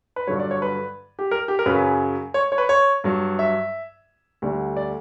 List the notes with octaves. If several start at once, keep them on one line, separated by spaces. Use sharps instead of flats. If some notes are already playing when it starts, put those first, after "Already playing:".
B4
G2 D3 F#3 C#5
D5
C#5
B4
G4
A#4
G4
A#4
F#2 C#3 F#3 B4
C#5
C#5
B4
C#5
G2 F#3
E5
D2 D3 G3
D5